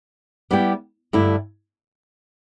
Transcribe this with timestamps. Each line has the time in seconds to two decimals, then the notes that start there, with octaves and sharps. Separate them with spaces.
0.51 G3 B3 E4 G4
1.13 G2 D3 A3 E4